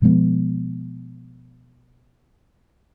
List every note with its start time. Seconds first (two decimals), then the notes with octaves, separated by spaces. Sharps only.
0.02 B2 F3 G#3 B3